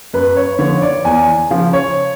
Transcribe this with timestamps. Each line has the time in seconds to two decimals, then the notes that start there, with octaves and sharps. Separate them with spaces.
0.13 F#2 B4
0.36 C#5
0.59 D3 F3 C#5
0.82 D5
1.05 E2 G#5
1.50 C#3 F3
1.73 C#5